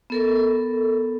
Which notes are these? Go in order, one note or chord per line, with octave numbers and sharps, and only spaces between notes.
B3 A4 A#4